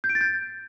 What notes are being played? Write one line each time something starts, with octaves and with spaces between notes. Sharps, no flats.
G6
D7
A6
G6